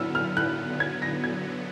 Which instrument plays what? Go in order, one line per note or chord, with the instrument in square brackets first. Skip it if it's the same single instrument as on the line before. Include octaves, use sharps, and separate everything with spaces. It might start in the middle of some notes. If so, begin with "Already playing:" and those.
Already playing: [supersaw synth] D3 F#3 B3 [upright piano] E6 F6
[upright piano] F6
F#6
G#6
A#6
G#6